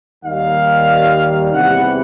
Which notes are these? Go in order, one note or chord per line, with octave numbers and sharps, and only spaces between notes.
D#2 D#3 G3 F5
E2 C3 E3 G3 F#5